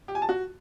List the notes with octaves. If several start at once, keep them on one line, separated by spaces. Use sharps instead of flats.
G4
G#5
A5
F#4